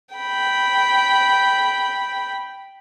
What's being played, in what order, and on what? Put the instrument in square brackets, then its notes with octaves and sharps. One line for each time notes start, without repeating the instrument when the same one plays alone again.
[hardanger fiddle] G5 B5